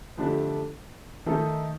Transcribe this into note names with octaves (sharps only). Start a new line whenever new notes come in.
F2 D3 A3 D4 G4
D#3 A3 D#4 A4